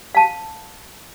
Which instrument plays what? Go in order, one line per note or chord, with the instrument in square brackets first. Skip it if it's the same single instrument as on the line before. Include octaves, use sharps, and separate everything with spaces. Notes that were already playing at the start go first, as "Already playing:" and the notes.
[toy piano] F5 A5